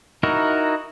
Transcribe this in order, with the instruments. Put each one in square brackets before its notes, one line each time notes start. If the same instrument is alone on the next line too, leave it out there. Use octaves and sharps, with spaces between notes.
[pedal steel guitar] D#4 E4 F#4 A#4